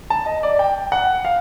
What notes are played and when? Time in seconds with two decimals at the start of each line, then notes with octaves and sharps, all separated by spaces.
0.10 A5
0.26 D#5
0.43 D5
0.59 G5
0.92 F#5
1.25 F5